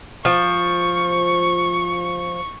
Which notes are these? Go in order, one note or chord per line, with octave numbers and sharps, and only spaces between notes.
F3 C#6